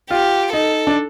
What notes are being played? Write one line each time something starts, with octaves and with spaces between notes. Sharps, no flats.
F4 G4
D#4 A4
D4